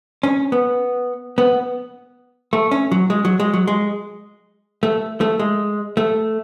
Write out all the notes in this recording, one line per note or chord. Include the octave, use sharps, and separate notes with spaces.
C#4
B3
B3
A3
C#4
F#3
G#3
F#3
G#3
F#3
G#3
A3
A3
G#3
A3